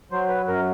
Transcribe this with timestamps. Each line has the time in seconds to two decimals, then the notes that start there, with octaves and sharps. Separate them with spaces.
0.12 F#3 C5
0.29 B4
0.48 F#2 A#4